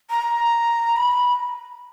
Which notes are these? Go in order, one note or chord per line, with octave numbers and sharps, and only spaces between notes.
A#5
B5